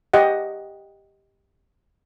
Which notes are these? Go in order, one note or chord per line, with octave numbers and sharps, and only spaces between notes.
G4 D#5 F#5